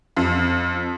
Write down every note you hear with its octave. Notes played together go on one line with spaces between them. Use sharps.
F2